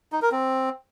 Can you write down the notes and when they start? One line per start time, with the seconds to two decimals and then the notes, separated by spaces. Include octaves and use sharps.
0.12 D#4
0.22 A#4
0.32 C4